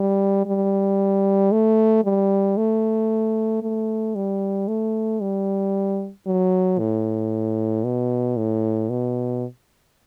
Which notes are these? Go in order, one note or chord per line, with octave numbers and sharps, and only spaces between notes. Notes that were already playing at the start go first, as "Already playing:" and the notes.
Already playing: G3
G3
A3
G3
A3
A3
G3
A3
G3
F#3
A2
B2
A2
B2